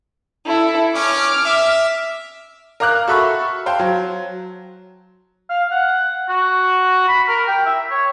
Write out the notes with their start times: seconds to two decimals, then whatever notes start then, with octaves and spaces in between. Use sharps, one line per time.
0.45 E4 A4
0.95 C#4 D6 F6
1.46 E5
2.80 A#4 F5 A#5 D6 F6 F#6
3.08 F#4 A4 E5 B5 C#6
3.66 C5 F5 G5 A5 C6
3.79 F#3
5.50 F5
5.71 F#5
6.29 F#4
7.08 B5
7.28 A#4
7.47 G5
7.65 E5
7.91 C#5